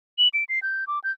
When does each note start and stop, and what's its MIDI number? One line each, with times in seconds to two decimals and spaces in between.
0.18 0.28 102
0.34 0.44 98
0.49 0.59 96
0.63 0.85 91
0.87 0.99 86
1.04 1.11 91